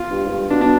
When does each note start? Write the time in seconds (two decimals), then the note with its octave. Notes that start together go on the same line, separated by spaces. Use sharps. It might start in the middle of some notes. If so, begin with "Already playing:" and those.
Already playing: F4
0.11 G2
0.26 G#2
0.31 G2
0.50 B2 D4
0.61 D4